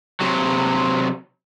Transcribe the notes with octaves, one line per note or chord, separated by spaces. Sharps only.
C3 F#3